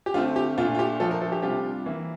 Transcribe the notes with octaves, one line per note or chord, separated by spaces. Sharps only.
G4
D3 A3 C4 F4
G4
A#2 A3 D4 F4
F4
G4
F3 A3 D4 F4 A4
A#4
A4
G4
C3 G3 D4 F4 G4
E3 A#3 E4